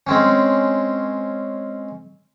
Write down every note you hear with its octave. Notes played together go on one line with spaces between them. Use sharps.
G#3 C4 C#4